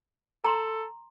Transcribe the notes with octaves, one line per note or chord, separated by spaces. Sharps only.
A4 A#5 C6